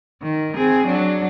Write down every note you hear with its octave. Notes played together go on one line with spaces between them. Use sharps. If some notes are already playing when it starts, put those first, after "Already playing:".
D#3
C4 G#4
F#3 D4